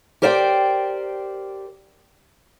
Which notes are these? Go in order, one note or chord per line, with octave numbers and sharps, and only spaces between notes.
G4 A#4 C5 D5 E5 G5